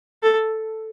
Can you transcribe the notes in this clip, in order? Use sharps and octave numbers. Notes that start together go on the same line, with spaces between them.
A4